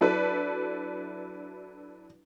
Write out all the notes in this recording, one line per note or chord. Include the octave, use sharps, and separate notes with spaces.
F#3 D4 E4 A4 B4